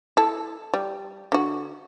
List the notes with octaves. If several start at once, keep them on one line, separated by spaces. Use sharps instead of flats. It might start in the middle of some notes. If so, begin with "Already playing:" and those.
E4 A4
G3
D3 F#4